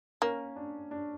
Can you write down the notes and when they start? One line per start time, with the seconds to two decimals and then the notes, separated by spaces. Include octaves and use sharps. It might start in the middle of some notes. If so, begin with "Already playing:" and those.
0.22 A#3 C#4
0.56 D4
0.91 D4